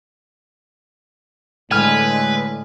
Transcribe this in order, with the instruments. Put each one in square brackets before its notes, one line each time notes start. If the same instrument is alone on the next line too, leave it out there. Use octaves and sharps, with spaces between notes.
[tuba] A2 [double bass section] D3 G#3 [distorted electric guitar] B4 [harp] G#5 F6